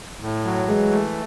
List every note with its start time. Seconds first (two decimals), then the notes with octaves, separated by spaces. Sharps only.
0.22 A2
0.45 F#3
0.67 E3 G#3
0.91 A3